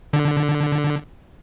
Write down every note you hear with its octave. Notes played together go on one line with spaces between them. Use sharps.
D3